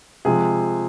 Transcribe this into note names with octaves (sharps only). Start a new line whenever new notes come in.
C3 F3 G#3 G#4